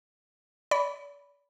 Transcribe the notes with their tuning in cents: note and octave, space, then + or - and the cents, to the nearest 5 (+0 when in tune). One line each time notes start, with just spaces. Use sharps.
D5 -40 B5 +0